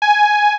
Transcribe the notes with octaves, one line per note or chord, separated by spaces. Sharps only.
G#5